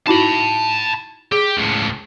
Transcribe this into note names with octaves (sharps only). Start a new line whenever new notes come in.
D#4 E4 F#4 A5 B5
G4 G#4
C#2 A2